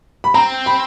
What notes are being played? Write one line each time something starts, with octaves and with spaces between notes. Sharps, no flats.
B5
C4 A#5
B5